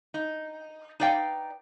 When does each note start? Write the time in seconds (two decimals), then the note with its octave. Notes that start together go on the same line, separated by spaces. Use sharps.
0.14 D#4
1.00 D#4 B4 D5 F5 G5